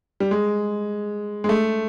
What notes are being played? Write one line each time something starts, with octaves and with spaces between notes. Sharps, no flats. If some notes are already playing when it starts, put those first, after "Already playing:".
G3
G#3
G#3
A3